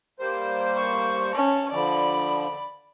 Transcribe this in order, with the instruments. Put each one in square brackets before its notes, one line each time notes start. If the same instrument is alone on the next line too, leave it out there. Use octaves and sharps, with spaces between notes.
[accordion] G3 A#3 C5
[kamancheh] C#6
C#4 A5
[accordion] D3 F3 [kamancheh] D5 B5